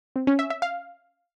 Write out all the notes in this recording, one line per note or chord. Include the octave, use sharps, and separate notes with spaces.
C4
C#4
E5
E5
F5